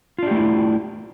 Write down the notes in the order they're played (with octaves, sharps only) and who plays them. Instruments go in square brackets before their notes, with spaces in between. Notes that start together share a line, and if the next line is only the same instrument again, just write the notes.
[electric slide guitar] F4
D4
G4
A3
E4